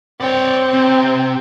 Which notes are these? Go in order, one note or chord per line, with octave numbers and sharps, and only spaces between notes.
C4 C#5 D5
C3